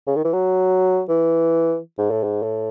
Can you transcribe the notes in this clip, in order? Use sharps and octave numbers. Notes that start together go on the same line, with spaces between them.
C#3
D#3
E3
F#3
E3
G#2
A2
G#2
A2